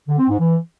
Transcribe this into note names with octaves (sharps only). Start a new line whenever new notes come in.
D3
C4
G#2
E3